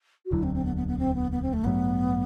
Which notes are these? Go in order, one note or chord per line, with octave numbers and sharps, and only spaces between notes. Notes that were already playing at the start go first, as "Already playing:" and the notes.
F#4
E1 D2 D3 F#3 E4
C4
C4
B3
B3
B3
C4
B3
B3
C4
A3
A1 G2 F#3 A3 B3